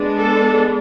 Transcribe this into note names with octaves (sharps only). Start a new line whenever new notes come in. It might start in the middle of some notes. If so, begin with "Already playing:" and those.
Already playing: G#3 B3 D4
A4